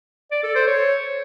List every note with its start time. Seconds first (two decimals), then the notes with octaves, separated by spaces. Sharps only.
0.31 D5
0.43 A4
0.55 C5
0.67 C#5